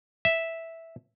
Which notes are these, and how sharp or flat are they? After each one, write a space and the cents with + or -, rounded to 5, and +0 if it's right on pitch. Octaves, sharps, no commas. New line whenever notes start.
E5 -5